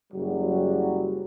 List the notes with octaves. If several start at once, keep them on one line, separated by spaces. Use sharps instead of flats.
F#1 F#3 G3